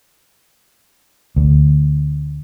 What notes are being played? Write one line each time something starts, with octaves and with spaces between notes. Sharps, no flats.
D2